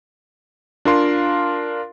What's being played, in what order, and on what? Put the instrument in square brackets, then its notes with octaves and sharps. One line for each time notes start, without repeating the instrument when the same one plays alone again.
[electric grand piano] D4 F4 A#4 F5 C6